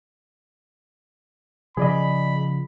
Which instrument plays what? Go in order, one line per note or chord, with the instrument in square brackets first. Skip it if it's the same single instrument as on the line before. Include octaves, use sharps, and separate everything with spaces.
[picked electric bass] C#3 F3 [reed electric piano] G#4 D5 D#5 [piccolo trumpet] B5